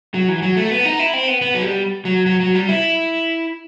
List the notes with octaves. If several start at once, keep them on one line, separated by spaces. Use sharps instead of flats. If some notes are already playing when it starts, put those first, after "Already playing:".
F#3
E3
F#3
A3
B3
D#4
E4
C4
B3
B3
F#3
G3
F#3
F#3
F#3
G3
E4